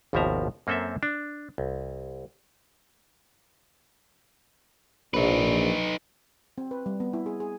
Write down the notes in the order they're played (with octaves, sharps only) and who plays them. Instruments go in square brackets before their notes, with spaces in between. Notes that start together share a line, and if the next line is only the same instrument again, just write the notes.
[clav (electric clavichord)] G#1 D#2 B2 F3 E5 A#5
F#2 A#3 C4 A4 C5 E5
D4
C2
[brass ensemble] A#1 [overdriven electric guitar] D#4 B4
[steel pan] C4
B4
G3
B3
E4
G#4
G#4